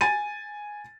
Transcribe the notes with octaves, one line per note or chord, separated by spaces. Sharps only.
G#5 A6 D#7